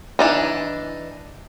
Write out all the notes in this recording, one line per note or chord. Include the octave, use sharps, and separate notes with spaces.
E3 D4 D#4